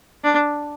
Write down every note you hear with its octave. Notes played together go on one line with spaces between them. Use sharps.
D4